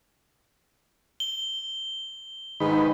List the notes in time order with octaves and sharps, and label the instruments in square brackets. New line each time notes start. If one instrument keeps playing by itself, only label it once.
[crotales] G7
[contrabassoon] G#2 [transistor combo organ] D#3 B4